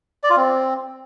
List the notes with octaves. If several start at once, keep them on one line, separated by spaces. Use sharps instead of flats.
D5
F4
C4